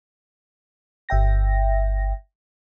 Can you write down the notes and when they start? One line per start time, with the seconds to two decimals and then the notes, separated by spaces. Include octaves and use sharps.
1.09 G1 E5 G5 A#6